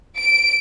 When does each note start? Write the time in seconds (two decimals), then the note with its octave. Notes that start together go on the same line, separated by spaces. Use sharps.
0.18 D7